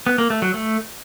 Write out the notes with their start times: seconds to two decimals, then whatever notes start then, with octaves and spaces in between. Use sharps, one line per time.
0.07 B3
0.18 A#3
0.30 A3
0.42 F#3
0.54 A3